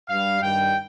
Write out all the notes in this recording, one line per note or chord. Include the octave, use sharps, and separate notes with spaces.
G2 G3 F5
G2 D#3 G3 G5